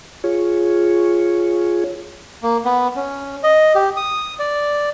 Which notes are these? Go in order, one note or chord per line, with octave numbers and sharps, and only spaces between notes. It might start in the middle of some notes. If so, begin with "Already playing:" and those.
F4 G#4 C#5
A#3
B3
C#4
D#5
G4
D#6
D5